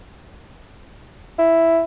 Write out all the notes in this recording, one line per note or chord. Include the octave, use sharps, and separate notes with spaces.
E4